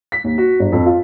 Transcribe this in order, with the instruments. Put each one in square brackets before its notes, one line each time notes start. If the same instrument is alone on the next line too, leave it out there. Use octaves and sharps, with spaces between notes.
[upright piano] B6
D#2
F#4
G1
F2
F4